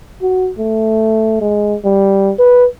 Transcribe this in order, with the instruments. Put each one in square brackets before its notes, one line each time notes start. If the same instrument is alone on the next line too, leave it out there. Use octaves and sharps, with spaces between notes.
[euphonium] F#4
A3
G#3
G3
B4